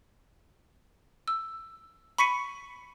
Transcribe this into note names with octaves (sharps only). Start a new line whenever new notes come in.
E6
B5 C#6 B6 C#7 D#7